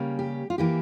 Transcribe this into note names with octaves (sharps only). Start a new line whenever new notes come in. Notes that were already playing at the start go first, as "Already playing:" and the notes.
Already playing: C#3 G3 A#3 C#4
G4
F4
E3 A#3 E4 G4